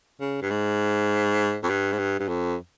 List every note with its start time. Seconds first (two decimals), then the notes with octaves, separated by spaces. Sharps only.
0.21 C#3
0.42 G2
0.51 G#2
1.63 F2
1.70 G2
1.92 G#2
1.98 G2
2.20 G2
2.28 F2